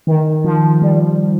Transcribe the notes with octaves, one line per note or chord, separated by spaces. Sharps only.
D#3
F3
G3